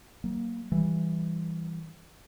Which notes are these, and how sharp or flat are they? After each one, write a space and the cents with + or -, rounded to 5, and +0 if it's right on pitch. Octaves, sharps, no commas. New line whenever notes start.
F#3 +40 A#3 +0
E3 +0 G3 +0